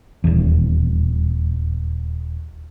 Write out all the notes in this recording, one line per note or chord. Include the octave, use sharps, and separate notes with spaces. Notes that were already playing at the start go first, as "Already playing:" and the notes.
D#1 E2